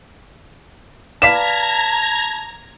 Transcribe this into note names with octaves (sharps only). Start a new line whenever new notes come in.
B4 D5 F5 A5 A#5 G#6 B6 E7